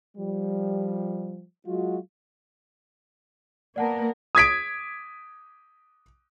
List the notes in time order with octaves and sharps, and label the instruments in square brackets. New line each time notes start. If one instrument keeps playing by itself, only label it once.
[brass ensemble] F3 G3
F#3 G#3 F4 F#4
[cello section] A#3 B3 A#4 [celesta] D5 F#5 A5
[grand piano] D#6 G#6 B6 D7